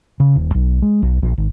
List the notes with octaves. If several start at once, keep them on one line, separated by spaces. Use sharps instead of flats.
C#3
D#1
B1
G#3
B1
A#1
G#1